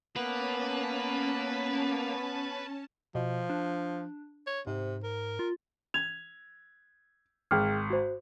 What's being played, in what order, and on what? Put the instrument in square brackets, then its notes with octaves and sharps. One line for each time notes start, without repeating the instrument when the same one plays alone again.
[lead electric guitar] A#3 [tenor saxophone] B3 [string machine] C#4 A5 [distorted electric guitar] B4
[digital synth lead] B2 [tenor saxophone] F3
[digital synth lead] D4
[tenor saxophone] C#5
[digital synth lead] G#2 [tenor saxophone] C3
[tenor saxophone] A#4
[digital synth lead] F4
[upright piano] G#6 [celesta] F7
[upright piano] G#1 [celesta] G#4 G5 F6
[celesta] F#4 C5